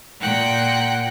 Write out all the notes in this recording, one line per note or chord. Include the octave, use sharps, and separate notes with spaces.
A#2 F#5 G5